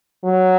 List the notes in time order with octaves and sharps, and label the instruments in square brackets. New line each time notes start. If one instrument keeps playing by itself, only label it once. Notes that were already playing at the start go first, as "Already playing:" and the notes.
[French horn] F#3